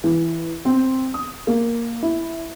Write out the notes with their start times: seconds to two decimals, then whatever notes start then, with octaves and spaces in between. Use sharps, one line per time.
0.04 E3
0.65 C4
1.14 D#6
1.47 A#3
2.03 E4